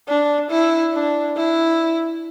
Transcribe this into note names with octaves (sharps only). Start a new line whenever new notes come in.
D4
E4
D4
E4